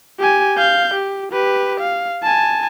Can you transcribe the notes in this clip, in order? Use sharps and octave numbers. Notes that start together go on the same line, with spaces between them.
G4 G#5
F5 G6
G4
G4 B4
F5
G#5 A5